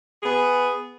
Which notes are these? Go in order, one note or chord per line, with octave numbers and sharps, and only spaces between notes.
B3 G#4